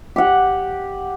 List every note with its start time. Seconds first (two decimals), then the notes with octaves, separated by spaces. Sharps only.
0.16 G4 F#5